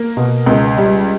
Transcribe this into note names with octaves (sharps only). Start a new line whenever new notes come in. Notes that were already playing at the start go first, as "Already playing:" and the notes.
Already playing: A#3
B2
C#2
G3